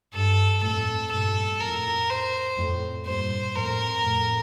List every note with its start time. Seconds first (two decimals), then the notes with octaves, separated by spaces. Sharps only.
0.14 G2 A4
0.63 F2 A2 A4
1.12 G2 A#2 A4
1.60 F2 A2 A#4
2.09 C5
2.58 F2 A2
3.06 G2 A#2 C5
3.54 F2 A2 A#4
4.03 F2 A2